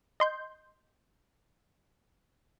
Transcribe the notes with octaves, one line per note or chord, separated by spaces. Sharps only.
D#5 C6 G6